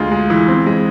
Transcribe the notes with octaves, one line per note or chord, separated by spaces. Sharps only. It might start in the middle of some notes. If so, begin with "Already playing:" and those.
Already playing: D2 G#3 F4
G#3
E3
C4
G#3